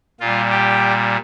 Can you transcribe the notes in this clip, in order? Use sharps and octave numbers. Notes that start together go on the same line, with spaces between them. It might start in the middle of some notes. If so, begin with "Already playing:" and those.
A#2 G3 F4
G4